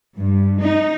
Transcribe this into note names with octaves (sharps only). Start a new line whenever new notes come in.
G2
D#4